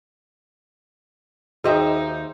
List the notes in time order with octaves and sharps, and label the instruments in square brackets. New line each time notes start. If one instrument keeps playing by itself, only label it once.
[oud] D#2 D#5 E5 [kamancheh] D#4 [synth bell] F#4 G#4 [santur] C5 G5